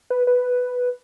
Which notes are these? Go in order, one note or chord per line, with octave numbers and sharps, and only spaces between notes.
B4
B4